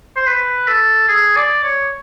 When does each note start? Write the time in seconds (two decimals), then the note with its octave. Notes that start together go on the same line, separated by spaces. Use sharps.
0.16 C5
0.27 B4
0.67 A4
1.08 G#4
1.36 D5
1.64 C#5